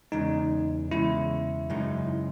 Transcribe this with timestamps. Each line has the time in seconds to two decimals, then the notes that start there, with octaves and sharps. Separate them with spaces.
0.12 E2 C#3 G#3 D#4
0.91 E2 C#3 G#3 E4
1.70 F#2 C#3 G#3 D#4